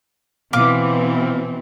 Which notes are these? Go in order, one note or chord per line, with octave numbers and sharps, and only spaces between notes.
B2 E3 C4 F4 D6